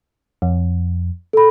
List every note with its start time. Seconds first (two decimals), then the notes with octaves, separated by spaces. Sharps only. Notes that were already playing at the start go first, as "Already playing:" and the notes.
0.42 F2
1.33 A4 B5